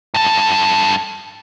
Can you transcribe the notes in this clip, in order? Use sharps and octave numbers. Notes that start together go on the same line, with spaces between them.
G2 A4